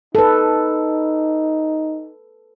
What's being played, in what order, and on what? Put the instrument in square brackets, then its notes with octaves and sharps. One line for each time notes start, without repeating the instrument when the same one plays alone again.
[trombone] D#4 [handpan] A4 B4